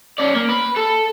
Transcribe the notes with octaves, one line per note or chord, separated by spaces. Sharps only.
C#4 D5
A#3
B4
A4